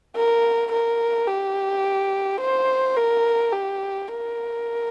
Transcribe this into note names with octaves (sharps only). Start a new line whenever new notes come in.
A#4
A#4
G4
C5
A#4
G4
A#4